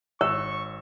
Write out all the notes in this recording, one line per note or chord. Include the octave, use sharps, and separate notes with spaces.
G#1 C#5 C#6 E6